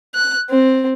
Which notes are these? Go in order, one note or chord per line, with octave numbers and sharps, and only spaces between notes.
F#6
C4